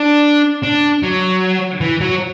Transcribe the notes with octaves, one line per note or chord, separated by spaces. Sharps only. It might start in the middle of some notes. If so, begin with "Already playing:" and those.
Already playing: D4
D4
F#3
E3
F#3